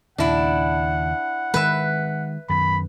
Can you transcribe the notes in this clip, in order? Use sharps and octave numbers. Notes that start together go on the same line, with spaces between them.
D#2 A#2 C#3 D4 E4 F#5
D#3 G#3 B4 E5
F#2 D#3 B5